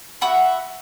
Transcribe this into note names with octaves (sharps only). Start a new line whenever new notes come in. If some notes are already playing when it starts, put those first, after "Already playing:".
F#4 E5 F#5 B5